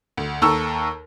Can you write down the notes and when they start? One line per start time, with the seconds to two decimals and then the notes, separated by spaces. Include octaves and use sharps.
0.17 D2
0.42 D#2 A4 A#5 C#6 E6